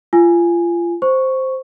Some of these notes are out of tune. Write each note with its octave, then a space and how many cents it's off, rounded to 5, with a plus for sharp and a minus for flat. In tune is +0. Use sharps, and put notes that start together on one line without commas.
F4 -25 G#5 +0
C5 +0 C#6 +0